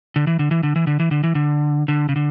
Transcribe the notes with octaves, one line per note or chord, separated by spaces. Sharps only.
D3
E3
D3
E3
D3
E3
D3
E3
D3
E3
D3
D3
C#3
D3